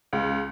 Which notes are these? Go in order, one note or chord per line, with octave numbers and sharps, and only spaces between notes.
C#2